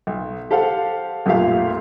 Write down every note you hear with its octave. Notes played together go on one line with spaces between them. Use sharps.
B1
G4 A4 C5 F5 F#5
B1 F#2 A#2 A3 G4 F5